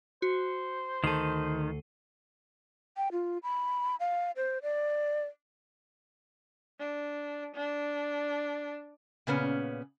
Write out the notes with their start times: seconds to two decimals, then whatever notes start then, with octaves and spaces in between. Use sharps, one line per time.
0.22 F#4 C5
1.04 D2 D#3 A4 C7 D#7
2.97 G5
3.12 F4
3.43 B5
4.00 F5
4.36 C5
4.63 D5
6.79 D4
7.55 D4
9.27 A#2 C#3 B3 C#4